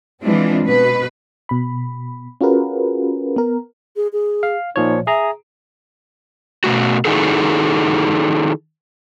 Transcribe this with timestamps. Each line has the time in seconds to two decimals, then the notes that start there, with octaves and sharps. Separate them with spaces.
0.22 E3 G#3 C4 D4 F4
0.65 B2 B4
1.49 B2 B5
2.41 C#4 F4 F#4 G#4 A#4 B4
3.36 B3 A#4
3.96 G#4
4.13 G#4
4.43 F5
4.76 A#2 F3 D#4 C#5
5.07 G#4 E5 A#5
6.64 B2 D#3 A3 F#4
7.05 D#3 D#4 E4 F#4 G#4 A4